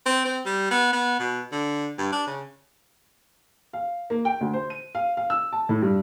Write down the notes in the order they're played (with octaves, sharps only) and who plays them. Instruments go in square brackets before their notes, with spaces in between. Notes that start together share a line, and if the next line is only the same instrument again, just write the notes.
[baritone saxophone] C4
C4
G3
B3
B3
B2
D3
G2
D4
C#3
[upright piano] F5
A#3
G5
D2
C5
D#7
F5
F5
E6
A5
A2
G2